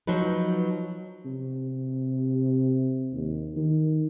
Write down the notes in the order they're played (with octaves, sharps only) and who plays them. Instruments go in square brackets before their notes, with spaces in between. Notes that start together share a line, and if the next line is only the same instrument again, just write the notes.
[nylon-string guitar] F3 F#3 D#4 B4
[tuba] C3
D#2
D#3